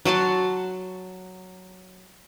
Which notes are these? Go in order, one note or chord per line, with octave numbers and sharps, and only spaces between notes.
F#3 F#4 A5 C6